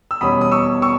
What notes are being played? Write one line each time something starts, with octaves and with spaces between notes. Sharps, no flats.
E6
E2 B2 G3 C#4 B5 D#6
D#6
C#6 E6
C#6 E6